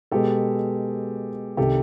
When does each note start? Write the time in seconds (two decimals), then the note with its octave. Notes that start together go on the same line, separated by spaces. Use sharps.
0.11 B2 G#3 B3 G4 A4
1.57 C2 C3 D#3 G4 A4